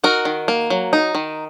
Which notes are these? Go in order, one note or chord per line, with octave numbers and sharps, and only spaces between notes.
D#4 F#4 A#4
D#3
A#3
F#3
D#4
D#3